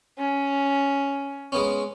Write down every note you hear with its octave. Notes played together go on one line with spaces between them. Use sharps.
C#4
G#3 B3 C#4